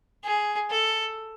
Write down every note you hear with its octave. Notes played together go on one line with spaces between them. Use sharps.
G#4
A4